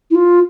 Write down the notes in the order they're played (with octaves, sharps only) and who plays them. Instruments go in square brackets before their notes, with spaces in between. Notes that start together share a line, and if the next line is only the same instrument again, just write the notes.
[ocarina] E4
F4